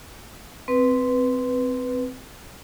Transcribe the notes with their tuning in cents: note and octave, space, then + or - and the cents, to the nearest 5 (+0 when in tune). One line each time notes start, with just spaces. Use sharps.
C4 -10 B4 +0